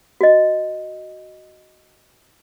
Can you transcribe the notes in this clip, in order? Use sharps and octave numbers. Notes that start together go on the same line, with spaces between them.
F#4 D#5